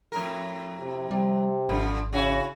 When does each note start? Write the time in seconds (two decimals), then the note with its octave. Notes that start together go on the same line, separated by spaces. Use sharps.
0.12 F2 A2 A#4
0.79 C3
1.11 C3 G3
1.69 G#1 F#2 D3 F3
2.13 C#3 C#4 E4 F#4